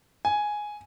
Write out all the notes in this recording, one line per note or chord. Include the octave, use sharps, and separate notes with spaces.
G#5